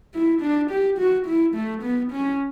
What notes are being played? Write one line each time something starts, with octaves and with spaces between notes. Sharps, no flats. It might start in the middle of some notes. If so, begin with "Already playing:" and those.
E4
D4
G4
F#4
E4
A3
B3
C#4